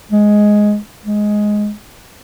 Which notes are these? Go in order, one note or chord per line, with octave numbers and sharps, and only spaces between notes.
G#3
G#3